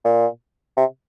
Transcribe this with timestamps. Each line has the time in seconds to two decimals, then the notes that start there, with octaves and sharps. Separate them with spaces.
0.05 A#2
0.77 C3